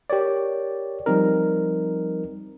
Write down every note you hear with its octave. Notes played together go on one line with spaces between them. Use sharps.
G4 A#4 C#5 D5
F3 G3 C4 D#4 A#4